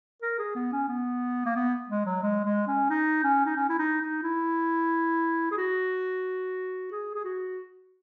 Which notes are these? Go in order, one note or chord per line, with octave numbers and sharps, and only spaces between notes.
A#4
G#4
B3
C#4
B3
A#3
B3
G#3
F#3
G#3
G#3
C#4
D#4
C#4
D#4
C#4
E4
D#4
D#4
E4
G#4
F#4
G#4
G#4
F#4